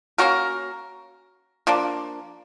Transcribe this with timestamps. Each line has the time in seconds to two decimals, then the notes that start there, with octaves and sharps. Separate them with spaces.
0.18 A#3 C#4 F#4 A#4
1.67 F3 A#3 D4